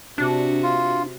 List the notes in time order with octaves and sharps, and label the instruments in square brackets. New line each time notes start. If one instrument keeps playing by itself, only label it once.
[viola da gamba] C3 F#4 [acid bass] D4
[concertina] F4